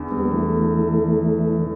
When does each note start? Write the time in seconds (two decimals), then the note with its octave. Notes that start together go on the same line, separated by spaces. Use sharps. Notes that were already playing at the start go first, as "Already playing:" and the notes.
Already playing: E2 D3
0.12 G3 B3
0.25 B3
0.31 E3 A3